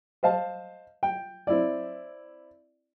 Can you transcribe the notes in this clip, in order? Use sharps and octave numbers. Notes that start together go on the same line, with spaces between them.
C5 D#5 F5 A5
G5
C4 E4 D5